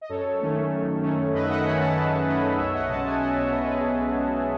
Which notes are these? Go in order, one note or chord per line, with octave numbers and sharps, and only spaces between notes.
D#5
F#2 A4 C#5
D#3 A3 C#4
F#2
D#3 A3 C#4
F#2 B4 D#5
E5
D#5 F#5
D#3 A3 C#4 G#5 B5
F#5 A5
F#2 G#4 B4
D#3 A3 C#4 B4 D#5
B1 C#5 E5
D#5 F#5
B2 G#3 C#4 F#5 A5
E5 G#5
B1 D#5 F#5
C#5 E5
B2 G#3 C#4 B4 D#5
G#4 B4
B1
B2 G#3 C#4